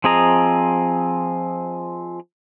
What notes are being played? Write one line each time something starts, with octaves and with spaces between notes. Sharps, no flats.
F3 C4 G#4 D#5 A#5